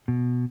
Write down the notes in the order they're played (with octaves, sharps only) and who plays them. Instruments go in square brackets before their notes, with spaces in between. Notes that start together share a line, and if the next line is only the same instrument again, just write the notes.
[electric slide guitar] B2